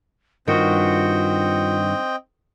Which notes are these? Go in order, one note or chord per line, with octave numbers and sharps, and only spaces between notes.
G2 D#3 C4 F4 F#4 D#5 G5